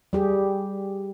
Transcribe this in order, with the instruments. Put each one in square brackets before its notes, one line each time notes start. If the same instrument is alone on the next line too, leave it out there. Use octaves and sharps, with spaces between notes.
[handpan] G3 G4 G#4